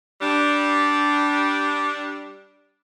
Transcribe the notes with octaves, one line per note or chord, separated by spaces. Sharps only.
G3 D4